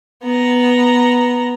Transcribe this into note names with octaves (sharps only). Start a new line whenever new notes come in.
B3 A#5